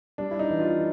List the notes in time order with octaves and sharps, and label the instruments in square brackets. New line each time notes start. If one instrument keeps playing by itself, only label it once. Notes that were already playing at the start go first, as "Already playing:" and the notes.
[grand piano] G3 D4
E4
D#4
E3
F4